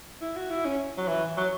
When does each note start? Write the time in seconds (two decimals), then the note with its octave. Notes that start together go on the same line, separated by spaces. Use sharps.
0.21 E4
0.36 F#4
0.50 E4
0.65 C#4
0.97 F#3
1.08 E3
1.37 F#3